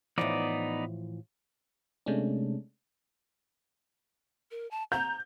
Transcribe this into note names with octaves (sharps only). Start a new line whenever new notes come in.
A2 E3 F3 B3 D#4 D5
C3 G#3 A3 C#4 D4
A#4
A5
A#5 G6